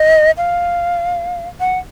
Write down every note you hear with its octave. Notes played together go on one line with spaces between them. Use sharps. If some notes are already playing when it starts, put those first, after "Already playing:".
Already playing: D#5
F5
F#5